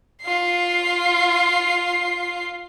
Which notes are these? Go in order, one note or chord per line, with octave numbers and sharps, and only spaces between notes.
F4 C7